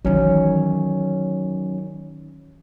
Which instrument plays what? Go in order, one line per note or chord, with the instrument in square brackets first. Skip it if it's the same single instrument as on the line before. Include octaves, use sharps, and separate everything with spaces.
[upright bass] D#3 E3 [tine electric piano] F#3 C#4 D#4